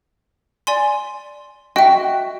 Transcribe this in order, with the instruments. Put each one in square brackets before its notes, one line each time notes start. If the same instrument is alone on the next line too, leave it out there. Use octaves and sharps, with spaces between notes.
[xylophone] D5 G#5 C6
[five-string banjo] F#4 G5 [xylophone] D#5 E5